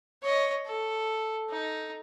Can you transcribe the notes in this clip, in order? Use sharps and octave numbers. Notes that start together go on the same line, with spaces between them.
C#5 D#5
A4
D#4